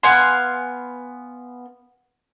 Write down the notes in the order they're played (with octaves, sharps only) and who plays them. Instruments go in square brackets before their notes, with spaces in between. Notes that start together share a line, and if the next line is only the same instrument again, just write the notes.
[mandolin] B3 F5 G#5 C6